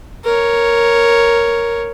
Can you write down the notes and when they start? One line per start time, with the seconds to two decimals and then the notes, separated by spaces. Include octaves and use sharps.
0.25 A#4 C#5